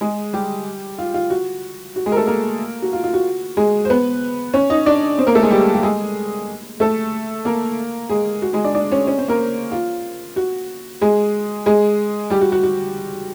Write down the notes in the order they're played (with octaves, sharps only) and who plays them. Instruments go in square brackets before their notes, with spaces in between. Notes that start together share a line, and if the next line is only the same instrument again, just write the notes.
[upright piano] G#3 G#4
G3 G4
F4
F4
F#4
F#4
G#3 G#4
A#4
A3 A4
A#3 A#4
F#4
F4
F4
F#4
G#3 G#4
C5
B3 B4
C#4 C#5
D#4 D#5
D4 D5
C4 C5
A#3 A#4
A3 A4
G#3 G#4
G3 G4
G4
G#3 G#4
A3 A4
A#3 A#4
G#3 G#4
F#4
G#3 G#4
D4 D5
D4 D5
C#4 C#5
C#4 C#5
C4 C5
A#3 A#4
F4
F#4
G#3 G#4
G#3 G#4
G3 G4
F#4
F#4
F#4